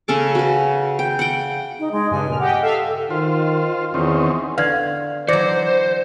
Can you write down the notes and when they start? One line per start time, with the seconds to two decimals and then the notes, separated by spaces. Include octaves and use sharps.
0.08 C#3 C#4 A4 D6
0.35 F#4 B4
0.99 G5
1.19 F#5 G5
1.79 D#4
1.92 G#3
2.11 G2 C#3 G#5
2.28 A#2 F6
2.39 G4 D#5 F#5 G5
2.62 A4 E5 F5
3.10 D#3 F4 C5
3.94 E2 D#3 C4 C#4
4.58 D3 B4 D5 F5 G#6
5.29 E3 F#3 C5 D5 A#6 C#7